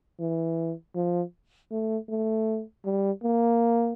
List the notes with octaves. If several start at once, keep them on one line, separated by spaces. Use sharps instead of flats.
E3
F3
A3
A3
G3
A#3